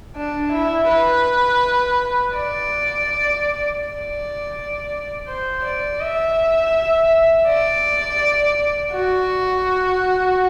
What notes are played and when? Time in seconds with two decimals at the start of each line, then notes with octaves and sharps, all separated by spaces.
0.16 D4
0.52 E4
0.88 B4
2.35 D5
3.82 D5
5.28 C5
5.64 D5
6.00 E5
7.47 D5
8.93 F#4